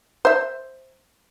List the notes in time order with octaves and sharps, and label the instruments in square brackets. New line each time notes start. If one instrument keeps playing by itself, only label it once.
[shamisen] C5 E5